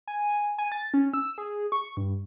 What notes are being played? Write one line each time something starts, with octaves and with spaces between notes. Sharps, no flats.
G#5
G#5
A6
C#4
E6
G#4
C#6
G2